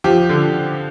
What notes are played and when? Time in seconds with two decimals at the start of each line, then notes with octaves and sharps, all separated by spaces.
0.04 F3 G4
0.29 D3